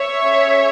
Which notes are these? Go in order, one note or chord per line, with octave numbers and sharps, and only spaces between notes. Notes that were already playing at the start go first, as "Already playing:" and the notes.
Already playing: C#5 E5
C#4 G#4